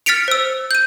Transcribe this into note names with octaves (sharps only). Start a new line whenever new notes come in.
F6 A6 B6 C#7 D7 F7
C5 E6
G6 D#7